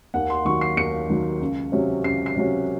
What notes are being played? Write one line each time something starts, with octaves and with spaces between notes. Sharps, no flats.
D#2 F#5
C6
D#3 F#3 C#6
C7
D#2 C#7
D#3 F#3
C#2
C3 F#3 C#4
C#2 C7
C7
C3 F#3 C#4